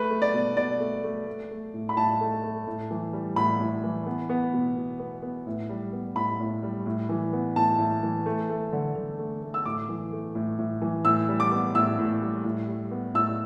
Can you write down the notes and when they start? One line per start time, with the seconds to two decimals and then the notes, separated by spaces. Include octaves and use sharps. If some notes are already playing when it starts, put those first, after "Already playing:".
Already playing: A3 B4
0.10 A3
0.22 D5
0.34 B2
0.57 B2 D5
0.80 A3
1.04 A3
1.27 A3
1.51 A3
1.74 A2
1.89 B5
1.96 A2 A5
2.21 A3
2.44 A3
2.67 A2
2.91 E3
3.13 G3
3.36 A2 B5
3.60 A2
3.84 E3
4.06 B3
4.29 B3
4.53 B2
4.77 B2
4.99 B3
5.22 B3
5.47 A2
5.69 G3
5.93 B3
6.16 A2 B5
6.40 A2
6.63 G3
6.86 A2
7.09 E3
7.33 B3
7.56 A2 A5
7.79 A2
8.03 E3
8.26 A3
8.49 A3
8.72 D3
8.95 D3
9.19 A3
9.43 A3
9.54 E6
9.66 A2 D6
9.89 E3
10.13 A3
10.35 A2
10.59 A2
10.82 E3
11.05 A2 E6
11.29 G3
11.40 D6
11.52 B3
11.75 A2 E6
11.99 A2
12.22 G3
12.45 A2
12.68 G3
12.91 B3
13.14 A2 E6